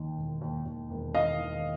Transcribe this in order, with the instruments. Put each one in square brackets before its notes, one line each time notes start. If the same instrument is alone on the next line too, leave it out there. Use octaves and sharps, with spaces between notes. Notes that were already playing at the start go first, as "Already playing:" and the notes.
Already playing: [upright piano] D#2 D#3
E1
D#2
D#2
E1
D#3 D#5 F5
D#3